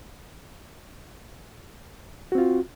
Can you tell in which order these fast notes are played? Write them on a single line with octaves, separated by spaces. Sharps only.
F#4 C4 F4